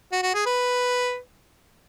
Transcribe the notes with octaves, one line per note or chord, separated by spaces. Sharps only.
F#4
F#4
G#4
B4